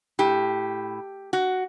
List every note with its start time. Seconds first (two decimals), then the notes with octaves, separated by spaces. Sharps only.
0.19 A2 G4
1.33 F#4